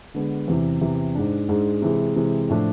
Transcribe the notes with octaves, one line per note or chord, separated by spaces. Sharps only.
D3 G#3 B3 D4
E2 C3 E3
E2 C3 E3
G#2 G#3 D4
G#2 G#3 D4
C3 E3 G#3
C3 E3 G#3
A2 F3 A3 D4